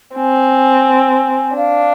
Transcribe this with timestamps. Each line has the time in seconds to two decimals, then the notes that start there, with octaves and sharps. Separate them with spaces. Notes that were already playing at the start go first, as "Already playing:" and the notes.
0.15 C4 G#5
1.56 D4 F5